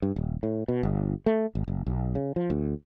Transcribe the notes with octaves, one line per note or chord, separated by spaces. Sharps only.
G2
D#1
A2
B2
G1
A3
G#1
F#1
B1
C#3
F3
D2